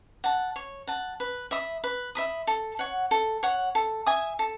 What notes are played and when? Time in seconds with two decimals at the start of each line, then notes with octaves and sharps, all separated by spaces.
0.24 F#5 A5
0.56 C#5
0.87 F#5 A5
1.20 B4
1.51 E5 B5 D#6
1.84 B4
2.15 E5 B5 D#6
2.47 A4
2.79 C#5 F#5
3.11 A4
3.43 C#5 F#5
3.75 A4
4.06 E5 G#5 D#6
4.39 A4